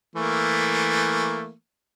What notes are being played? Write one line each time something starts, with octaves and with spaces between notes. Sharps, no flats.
E3 A3 A#3